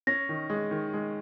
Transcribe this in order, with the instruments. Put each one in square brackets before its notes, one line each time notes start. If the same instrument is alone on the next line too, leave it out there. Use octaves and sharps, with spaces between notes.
[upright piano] C#4 [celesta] A#6
[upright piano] D#3
G#3
D#3
G#3